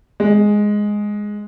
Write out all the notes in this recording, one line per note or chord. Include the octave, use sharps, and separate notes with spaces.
G#3